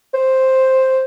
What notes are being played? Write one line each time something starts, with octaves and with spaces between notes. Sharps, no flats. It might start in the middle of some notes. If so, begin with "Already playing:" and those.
C5